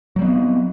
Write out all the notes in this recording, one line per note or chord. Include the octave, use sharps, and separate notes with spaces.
F#3 G3 B3 C4